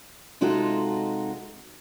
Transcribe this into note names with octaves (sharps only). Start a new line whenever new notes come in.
C3 G#3 D#4 F4 F#4 A4